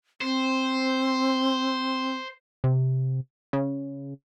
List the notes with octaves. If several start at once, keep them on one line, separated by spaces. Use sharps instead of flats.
C4 C5
C3
C#3